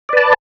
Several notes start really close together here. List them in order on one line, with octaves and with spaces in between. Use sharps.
D5 B4 A5